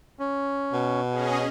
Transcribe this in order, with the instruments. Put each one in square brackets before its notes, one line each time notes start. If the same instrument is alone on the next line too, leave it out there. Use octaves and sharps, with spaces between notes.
[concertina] C#4
[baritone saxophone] B2
[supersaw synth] C#4 G#4 D#5